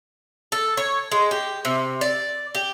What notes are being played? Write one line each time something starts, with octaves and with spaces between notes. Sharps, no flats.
A4
C#5
G#3
G4
C3
D5
G4